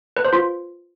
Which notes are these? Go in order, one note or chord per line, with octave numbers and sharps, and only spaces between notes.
B4
C5
F4